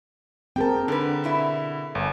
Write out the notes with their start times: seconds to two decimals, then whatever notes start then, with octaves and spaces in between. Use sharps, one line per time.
0.56 G2 C4 G#4 A#4 G5 A5
0.88 D3 D4 B4
1.24 B2 E4 E5
1.95 G1